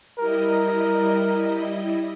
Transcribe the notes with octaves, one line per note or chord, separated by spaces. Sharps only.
G3 E4 A#4 D#5